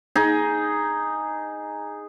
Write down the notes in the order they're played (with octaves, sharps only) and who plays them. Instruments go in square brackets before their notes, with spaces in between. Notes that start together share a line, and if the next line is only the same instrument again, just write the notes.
[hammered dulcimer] D#4 G#4